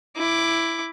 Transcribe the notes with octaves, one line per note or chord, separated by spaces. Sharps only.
E4 D6